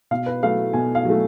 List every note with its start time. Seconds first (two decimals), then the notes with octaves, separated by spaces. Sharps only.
0.11 B2 F5
0.26 B4
0.42 F#3 A3 F5
0.73 B2 G#5
0.95 F5
1.05 F#3 A3